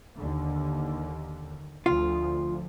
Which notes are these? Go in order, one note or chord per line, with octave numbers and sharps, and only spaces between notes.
D#2 D3
D2 F3 F4